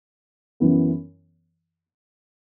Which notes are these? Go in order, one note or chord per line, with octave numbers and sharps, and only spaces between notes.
F#2 E3 B3